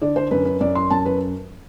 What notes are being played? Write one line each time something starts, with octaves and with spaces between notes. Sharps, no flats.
D3 D5
C5
F#2 B4
B4
F#2 D5
C6
F#2 A5
B4